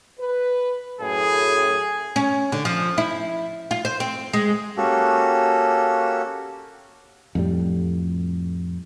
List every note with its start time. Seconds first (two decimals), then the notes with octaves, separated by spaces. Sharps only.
0.20 B4
1.01 F#2 A2 G#4
2.16 C#4
2.52 D3
2.65 F3
2.98 E4
3.71 F4
3.85 C5
4.00 C4
4.33 G#3
4.77 A#3 C#4 F#4 G4 A4
7.35 F2 A2 G3